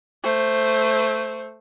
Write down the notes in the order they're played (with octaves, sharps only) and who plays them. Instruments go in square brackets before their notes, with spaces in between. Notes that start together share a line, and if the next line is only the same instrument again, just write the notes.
[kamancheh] A3 C5